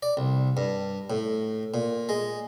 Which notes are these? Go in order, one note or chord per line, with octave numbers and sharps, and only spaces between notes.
D5
C2
G2
A2
A#2
G#3